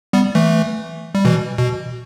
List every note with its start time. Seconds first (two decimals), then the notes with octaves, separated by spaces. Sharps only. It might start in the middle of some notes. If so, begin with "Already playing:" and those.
0.13 G3 B3
0.35 E3 A3
1.15 G3
1.25 B2 E3
1.58 B2